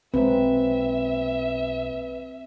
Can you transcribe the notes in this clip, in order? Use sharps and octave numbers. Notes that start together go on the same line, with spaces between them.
B1 G#3 A#3 C4 B4 E5